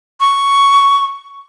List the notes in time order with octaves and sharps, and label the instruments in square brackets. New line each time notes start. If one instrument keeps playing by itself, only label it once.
[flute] C#6